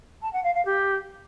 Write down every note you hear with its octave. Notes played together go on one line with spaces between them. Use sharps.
A5
F#5
F5
F5
G4